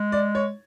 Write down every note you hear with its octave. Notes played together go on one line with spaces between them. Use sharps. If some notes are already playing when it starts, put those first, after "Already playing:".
Already playing: G#3
D5
C#5